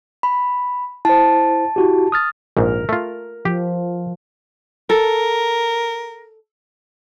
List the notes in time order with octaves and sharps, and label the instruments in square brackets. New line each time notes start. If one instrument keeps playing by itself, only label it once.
[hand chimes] B5
[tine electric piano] E4 C5 [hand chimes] A5
[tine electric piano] E4 F#4 G4
D#6 F6 A6
[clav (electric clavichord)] A#1 G#2 [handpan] A#4
[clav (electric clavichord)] A3 F4
[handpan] F3 [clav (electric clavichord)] G4
[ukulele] A4 [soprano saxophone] A#4